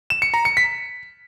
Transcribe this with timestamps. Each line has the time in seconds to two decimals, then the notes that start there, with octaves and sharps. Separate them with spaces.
0.10 E7
0.22 C#7
0.34 A#5
0.45 C#7
0.57 B6